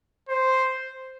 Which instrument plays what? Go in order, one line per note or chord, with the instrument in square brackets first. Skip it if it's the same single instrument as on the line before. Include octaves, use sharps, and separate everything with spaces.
[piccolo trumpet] C5